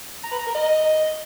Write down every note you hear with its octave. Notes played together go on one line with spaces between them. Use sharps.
A#5
B4
A#5
A#4
D#5